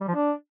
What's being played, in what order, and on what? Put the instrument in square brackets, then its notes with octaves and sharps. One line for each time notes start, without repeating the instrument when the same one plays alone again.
[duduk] G3
F3
D4